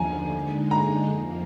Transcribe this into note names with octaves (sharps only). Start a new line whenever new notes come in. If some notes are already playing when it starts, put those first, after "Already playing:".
Already playing: D#2 D3 F3 G#5 A#5
D3 G#3 D#4
A#5
F2 F3 A#3